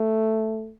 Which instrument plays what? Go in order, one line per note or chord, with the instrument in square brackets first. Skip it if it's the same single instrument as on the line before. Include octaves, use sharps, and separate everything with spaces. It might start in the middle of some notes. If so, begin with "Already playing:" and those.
Already playing: [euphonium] A3